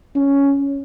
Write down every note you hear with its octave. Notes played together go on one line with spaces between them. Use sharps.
C#4